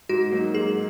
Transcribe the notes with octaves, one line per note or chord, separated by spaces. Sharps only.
G#2 F#4
F#3 A#3 D#4
G#2 G#4